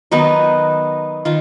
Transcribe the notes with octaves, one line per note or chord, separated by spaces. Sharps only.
D#3 F#3 B3 D#4
D#3 F4